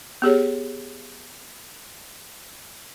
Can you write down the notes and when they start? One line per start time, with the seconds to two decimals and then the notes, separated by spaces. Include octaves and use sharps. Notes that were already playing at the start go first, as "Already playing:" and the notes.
0.22 B3 G4 G#4 C#5